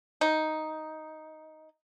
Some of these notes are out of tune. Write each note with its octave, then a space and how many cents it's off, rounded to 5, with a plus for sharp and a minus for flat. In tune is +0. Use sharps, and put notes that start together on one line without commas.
D#4 +5